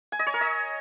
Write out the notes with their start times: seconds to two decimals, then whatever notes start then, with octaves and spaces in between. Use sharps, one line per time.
0.12 G#5
0.19 D#5
0.27 C#5
0.34 A#4
0.41 D#5